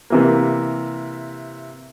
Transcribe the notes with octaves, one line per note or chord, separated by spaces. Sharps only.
C3 E3 A#3